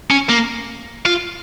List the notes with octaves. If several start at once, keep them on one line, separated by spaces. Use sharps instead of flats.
C#4
A#3
F4